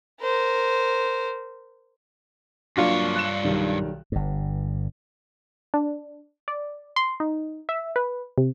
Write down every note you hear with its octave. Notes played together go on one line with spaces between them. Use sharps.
A#4 C5
G2 F#3 A#3 D4 F4 C#5 D5
F#6 E7
B1 D#3 G3
G1 G2
D4
D5
C6
D#4
E5
B4
C3